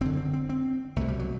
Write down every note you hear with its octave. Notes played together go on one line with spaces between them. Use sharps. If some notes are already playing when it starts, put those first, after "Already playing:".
F#1 F#2 D3 C4
C4
C4
C4
C2 B2 A3
G3
F#3